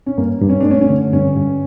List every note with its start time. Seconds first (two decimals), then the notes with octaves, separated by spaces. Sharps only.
0.06 C#4
0.18 G2 A#3
0.42 G2
0.49 C#4
0.61 A3 D4
0.71 C#4
0.81 C#4
0.89 D3
1.13 G2 C#4
1.37 G2